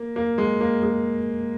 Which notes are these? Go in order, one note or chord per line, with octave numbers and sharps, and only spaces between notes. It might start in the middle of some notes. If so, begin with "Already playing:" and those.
Already playing: A#3
A#3
G#3
A#3
G#3